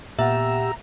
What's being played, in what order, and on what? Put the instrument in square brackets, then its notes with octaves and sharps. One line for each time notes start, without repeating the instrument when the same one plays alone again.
[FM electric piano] A#2 B3 F#5 [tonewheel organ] G4 E6 [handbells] E5 [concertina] A#5